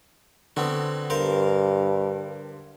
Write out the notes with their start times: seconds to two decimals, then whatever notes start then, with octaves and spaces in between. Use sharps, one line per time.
0.57 D3 B3 C4 F#4
1.10 G2 A#4 C5 F5